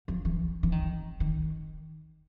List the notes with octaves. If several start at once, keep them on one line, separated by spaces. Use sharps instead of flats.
F3
E3
E3
D#3
D#3